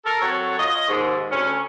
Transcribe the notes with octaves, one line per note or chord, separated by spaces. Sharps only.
A4 A#4
F#3 C4 F#4 A4 C#5
F4 C#5 D#5
D#2 G#2
D2 C#4